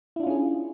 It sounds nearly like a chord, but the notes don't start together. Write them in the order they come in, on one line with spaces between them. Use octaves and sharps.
E4 D4 F4 C#4 G#4